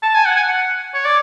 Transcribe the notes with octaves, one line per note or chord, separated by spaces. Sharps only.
A5
G#5
F#5
G#5
F#5
C#5
D5